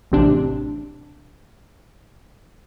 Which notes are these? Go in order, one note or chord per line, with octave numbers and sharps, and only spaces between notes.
A1 C3 D4